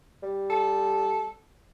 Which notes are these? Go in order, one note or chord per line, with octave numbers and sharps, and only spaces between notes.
G3
A4